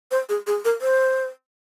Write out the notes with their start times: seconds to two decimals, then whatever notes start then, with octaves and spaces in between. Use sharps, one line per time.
0.11 C5
0.29 G#4
0.47 G#4
0.65 A#4
0.81 C5